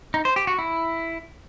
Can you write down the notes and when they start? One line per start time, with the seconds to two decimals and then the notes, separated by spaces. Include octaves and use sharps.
0.14 D#4
0.25 C5
0.36 G4
0.47 F#4
0.59 E4